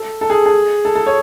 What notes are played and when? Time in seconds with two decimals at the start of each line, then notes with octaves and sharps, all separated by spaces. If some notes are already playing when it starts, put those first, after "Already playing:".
Already playing: A4
0.21 A4
0.30 G#4
0.46 G#4
0.85 A4
0.95 A4
1.06 C#5